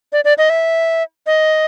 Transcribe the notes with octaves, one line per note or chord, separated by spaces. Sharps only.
D5
D5
D#5
E5
D#5